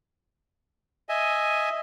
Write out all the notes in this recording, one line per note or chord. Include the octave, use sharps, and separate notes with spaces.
D#5 E5 G#5